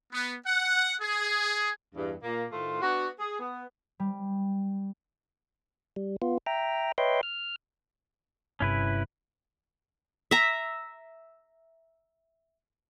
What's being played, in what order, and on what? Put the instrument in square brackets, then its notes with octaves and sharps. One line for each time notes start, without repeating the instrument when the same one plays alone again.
[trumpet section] B3
F#5
G#4
[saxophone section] E2 G2
A#2 A#3
A2 D#3 A3 F4 C5
B3 D4 F#4
G#4
B3
[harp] G3
[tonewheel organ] G3
B3 F4
E5 G5 A#5
B4 C#5 D#5 E5 G5 C6
F6
[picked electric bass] G1 G2 C3 [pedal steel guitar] C#4 E4 B4
[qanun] E5 A#5